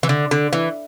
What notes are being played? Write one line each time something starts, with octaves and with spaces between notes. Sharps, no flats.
E3
D3
D3
E3